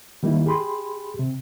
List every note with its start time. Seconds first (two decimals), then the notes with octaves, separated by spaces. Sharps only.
0.23 D#3 G3 A#3 D#4 E4
0.46 G4 G#4 B5 C6
1.19 C3